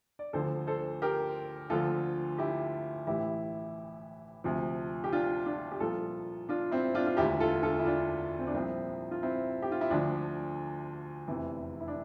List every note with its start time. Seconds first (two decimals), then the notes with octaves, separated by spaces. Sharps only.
0.19 D5
0.33 D2 D3 F3 A4 C5
0.67 A4 C5
1.02 G4 A#4
1.70 D2 D3 F3 F4 A4
2.38 E4 G4
3.07 A1 A2 E3 E4 G4
4.44 D2 C3 F3
5.04 G4
5.13 D4 F4
5.46 D4 F4
5.71 G4
5.80 C2 A#2 F3 F4 A4
6.49 D4 F4
6.71 C4 E4
6.95 D4 F4
7.07 F4
7.17 E1 D2 D3 E4 G4
7.40 F4 A4
7.63 F4 A4
7.79 E4
7.85 D4 F4
8.39 C4
8.47 D4
8.54 C2 A#2 F3 C4 E4
9.11 F4
9.23 C4 E4
9.62 G4
9.72 F4
9.81 E4
9.90 D2 D3 F3 D4
11.28 F1 E2 C3 E3
11.80 E4
11.88 D4